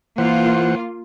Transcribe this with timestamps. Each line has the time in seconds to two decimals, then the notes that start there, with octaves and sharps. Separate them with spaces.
0.18 E3 A#3 F4 C5 F#5